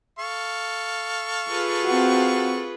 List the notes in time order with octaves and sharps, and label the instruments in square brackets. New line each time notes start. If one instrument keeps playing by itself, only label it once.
[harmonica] A4 F5 C#6
[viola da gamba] F4 G#4 B4
[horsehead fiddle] C4 F#4